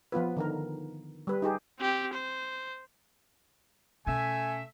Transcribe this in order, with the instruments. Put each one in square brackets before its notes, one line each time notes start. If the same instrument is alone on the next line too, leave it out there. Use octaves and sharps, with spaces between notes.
[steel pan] F3 B3 F4 B4
D3 D#3 A#4
G3 B4
D#4 G4 G#4
[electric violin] C4 G4
C5
[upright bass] B2 C#4 [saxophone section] A3 E5 [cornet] G#5